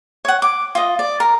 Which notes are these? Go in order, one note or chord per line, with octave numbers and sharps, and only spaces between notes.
C#5 F#5
D6
F4 D#5
D5
A#4